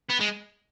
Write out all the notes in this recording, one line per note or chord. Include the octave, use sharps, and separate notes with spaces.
B3
G#3